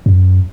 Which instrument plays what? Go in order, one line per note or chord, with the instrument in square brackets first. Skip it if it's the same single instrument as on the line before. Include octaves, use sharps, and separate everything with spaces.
[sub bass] F#2